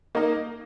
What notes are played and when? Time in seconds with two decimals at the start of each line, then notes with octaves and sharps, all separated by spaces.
0.15 A#3 D#4 A#4 D#5